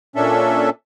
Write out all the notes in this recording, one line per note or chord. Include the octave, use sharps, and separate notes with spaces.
A#2 C#4 D4 A4 E5